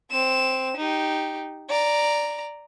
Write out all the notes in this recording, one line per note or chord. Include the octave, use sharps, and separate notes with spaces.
C4 E7
D#4 G4
D5 A#5